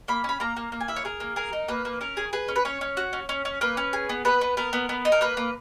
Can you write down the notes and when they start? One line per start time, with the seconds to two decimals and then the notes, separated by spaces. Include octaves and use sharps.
0.08 A#3 B5
0.24 C#4 B5
0.40 A#3 A#5
0.57 A#3
0.72 A#3
0.80 G#5
0.88 E4 E5
0.96 C#5
1.05 G#4 A#4
1.20 A#3
1.36 G#4 A#4
1.53 D#4
1.68 A#3 B4
1.85 A#3
2.01 C#4 A#4
2.17 G#4
2.33 G#4 B4
2.48 C#4
2.56 B4
2.65 C#4 C#5
2.81 C#4
2.97 F#4
3.13 C#4
3.29 C#4
3.45 C#4
3.61 A#3 B4
3.77 C#4
3.93 G#4
4.09 B3
4.25 B3 B4
4.41 B3
4.57 B3 A#4
4.73 B3
4.89 B3
5.05 D#4
5.12 A#4
5.21 A#3 B4
5.37 A#3